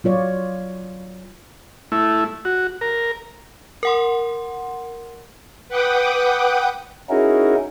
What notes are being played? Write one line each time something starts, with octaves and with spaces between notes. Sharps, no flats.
F#3 F4 C#5 D5
A3 E4
F#4
A#4
A#4 F#5 C6
B4 F#5 G5 D6 D#6
C#4 D#4 E4 F#4 G#4 A#4